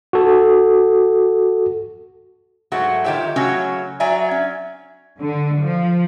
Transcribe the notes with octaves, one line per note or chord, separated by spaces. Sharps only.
F#4 A4
G#2 F#3 A3 F#4 F#5
D#3 F4 G4 C#5 E5
C#3 F#3 A3 C#4 F#4 C#5
F#3 D5 E5 G#5 A#5
C#4
D3
F3